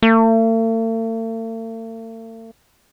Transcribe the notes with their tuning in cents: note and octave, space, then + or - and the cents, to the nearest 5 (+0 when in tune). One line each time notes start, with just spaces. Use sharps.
A3 +45